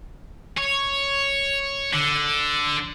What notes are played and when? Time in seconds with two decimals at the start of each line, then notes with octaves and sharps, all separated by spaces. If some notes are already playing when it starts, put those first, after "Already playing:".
0.58 C#5
1.93 D3